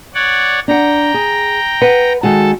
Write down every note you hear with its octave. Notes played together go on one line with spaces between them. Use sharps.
C#5 D5 F#5
D4 F#5 G5 A#5
G#4
B4 F#5
D#3 G#3 F#4 A4 A5